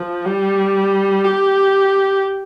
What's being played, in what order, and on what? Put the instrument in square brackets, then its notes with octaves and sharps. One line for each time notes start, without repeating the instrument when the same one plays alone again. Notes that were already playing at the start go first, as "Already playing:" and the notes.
Already playing: [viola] F3
G3
G4